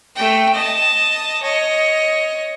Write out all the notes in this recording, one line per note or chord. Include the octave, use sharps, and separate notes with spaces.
A3 G5
D#5 A5
C#5 D#5